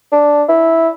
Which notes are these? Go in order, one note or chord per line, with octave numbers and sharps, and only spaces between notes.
D4
E4